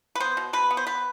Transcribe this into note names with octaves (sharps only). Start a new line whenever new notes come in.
B4
B3 C5
B2
B2 B4
B3
C5
B3 B4